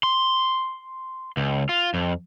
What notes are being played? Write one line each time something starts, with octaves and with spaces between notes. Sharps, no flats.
C6
C#2
F4
F2